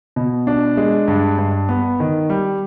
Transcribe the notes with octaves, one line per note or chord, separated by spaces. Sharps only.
B2
D4
G#3
G2
G2
B3
D#3
G3